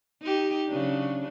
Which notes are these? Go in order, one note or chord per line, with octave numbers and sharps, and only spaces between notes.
D#4 G4
C#3 F#3 D4